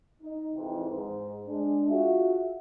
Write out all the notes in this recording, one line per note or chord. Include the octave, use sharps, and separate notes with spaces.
D#4
F2 G#2 C3 E3
G#2
G#3 D4
F4 F#4 G#4 E5